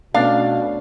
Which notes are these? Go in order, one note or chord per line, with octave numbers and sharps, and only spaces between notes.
B2 A3 B3 C#4 D4 F5